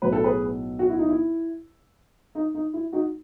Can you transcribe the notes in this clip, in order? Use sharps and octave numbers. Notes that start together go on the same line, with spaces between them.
B1 A2 F#3 B4
A4
G#4 B4
F#4
E4
D#4
E4
D#4
D#4
E4
D#4 F#4